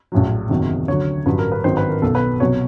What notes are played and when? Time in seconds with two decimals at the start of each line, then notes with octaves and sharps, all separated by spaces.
0.12 A#1 A2 F#3
0.49 F#1 E2 C3 D#3 F#3
0.88 D2 D3 F#3 C#5
1.26 A1 G2 D3 F#3 B4
1.39 A#4
1.52 B4
1.64 G#1 G2 D#3 F#3 C5
1.77 B4
1.89 A#4
2.02 B1 B2 F#3 A4
2.15 B4
2.40 C2 B2 F#3 C#5